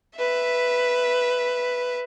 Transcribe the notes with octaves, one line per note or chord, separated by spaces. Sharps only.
B4 E5